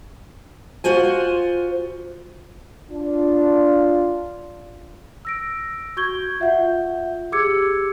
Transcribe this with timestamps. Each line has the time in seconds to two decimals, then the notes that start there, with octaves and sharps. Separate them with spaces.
0.84 F4 F#4 C5 G#5
2.90 D4 F4
5.25 E6 A#6 D7
5.97 F#4 C#6 G6 G#6 G7
6.40 F4 E5 F#5 G6
7.32 G4 G#4 D6 E6 G#6 C#7